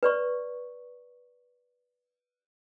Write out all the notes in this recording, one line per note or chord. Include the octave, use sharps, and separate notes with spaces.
B4 D5 C#6